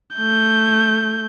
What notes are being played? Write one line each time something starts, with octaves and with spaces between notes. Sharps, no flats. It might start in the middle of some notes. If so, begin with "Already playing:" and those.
A3 G6